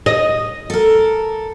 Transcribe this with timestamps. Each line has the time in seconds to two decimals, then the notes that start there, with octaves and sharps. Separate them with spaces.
0.06 D#5
0.70 A4 A#4